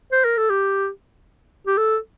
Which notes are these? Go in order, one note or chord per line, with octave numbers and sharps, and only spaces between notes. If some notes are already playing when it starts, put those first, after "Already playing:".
C5
A#4
A4
G4
G4
A4